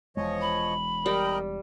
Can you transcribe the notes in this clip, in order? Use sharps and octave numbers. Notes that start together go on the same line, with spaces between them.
E1 E2 F3 G#3 C#5 D#5
B5
G3 A#4 D#5 G5